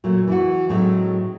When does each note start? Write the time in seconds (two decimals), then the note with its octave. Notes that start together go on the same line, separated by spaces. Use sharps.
0.04 A#2 F#3 A3
0.28 E3 E4 F#4
0.69 A2 F#3 G#3 A3 C4 D#4